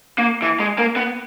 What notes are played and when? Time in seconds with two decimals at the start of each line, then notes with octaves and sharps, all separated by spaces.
0.18 A#3
0.42 E3
0.60 G#3
0.78 A#3
0.96 B3